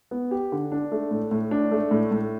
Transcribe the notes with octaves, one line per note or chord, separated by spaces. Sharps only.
B3
G4
D3
D4
A3
A2
A2
D4
A3
A2
A2